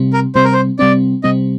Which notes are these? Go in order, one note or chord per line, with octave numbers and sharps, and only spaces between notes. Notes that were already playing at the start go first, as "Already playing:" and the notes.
Already playing: C3 G3 C4
A#4
C3 G3 C4 C5
A#4
C5
C3 G3 C4 D5
C3 G3 C4 D#5